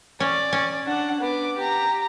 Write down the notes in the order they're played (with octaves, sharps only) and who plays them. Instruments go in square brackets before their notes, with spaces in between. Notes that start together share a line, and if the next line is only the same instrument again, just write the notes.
[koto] C#4 [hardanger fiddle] D5
[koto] C#4
[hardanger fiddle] D4 F#5
B3 D6
G4 A#5